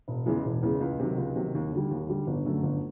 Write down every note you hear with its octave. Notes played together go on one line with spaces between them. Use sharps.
E1
E2 C#3 E3 G#3
E1
E2 C#3 E3 G#3
C#2
C3 D#3 F#3
C#2
C3 D#3 F#3
D#2
D3 G3
D#2
D3 G3
G1
F#2 D3 F#3 A3
G1